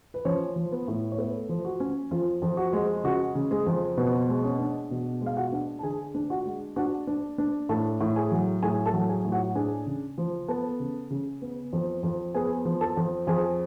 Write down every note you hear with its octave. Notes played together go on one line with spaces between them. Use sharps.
B4
F3 C#4 C#5
F3
B3 B4
A2
C#5
A3 B3 B4
F3
F#4
C#4
F2 F4
F2
F#4
G#3
C#3 F#4
C#3
G#3 G#4
F2
B2 B3 B4
G#3
C#4 C#5
D4
B2
G#3
F5
F#4 F#5
D4
A5
D3 G#4 G#5
D4
F#4 F#5
G#3
D4 F#4 F#5
D4
D4
A2 A4 A5
A2
G#4 G#5
F#3
A2 G#4 G#5
A4 A5
F#3
G#4 G#5
A2
F#4 F#5
D4 G#4 G#5
C#3
F3
B3 A4 A5
C#3
C#3
B3
F2
F2
B3 G#4 G#5
F3
A4 A5
F2
F2 G#4 G#5